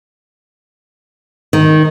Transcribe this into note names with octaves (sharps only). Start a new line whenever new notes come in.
D#3